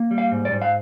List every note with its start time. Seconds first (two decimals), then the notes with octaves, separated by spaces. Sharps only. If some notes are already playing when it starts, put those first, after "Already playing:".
Already playing: A#3
0.11 G3
0.18 F5
0.32 G#2
0.45 D5
0.51 G#2
0.62 F5